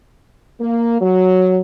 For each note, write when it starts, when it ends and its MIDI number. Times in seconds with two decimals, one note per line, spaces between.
0.61 1.01 58
1.01 1.61 54